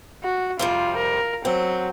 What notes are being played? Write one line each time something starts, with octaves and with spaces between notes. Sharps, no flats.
F#4
F2 C3 G3 F4
A#4
F#3 C4